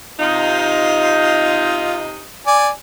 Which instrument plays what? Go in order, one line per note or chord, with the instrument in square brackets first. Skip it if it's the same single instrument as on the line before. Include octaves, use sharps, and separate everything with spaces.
[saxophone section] C3 D#4 [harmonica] F4
[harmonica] D5 G#5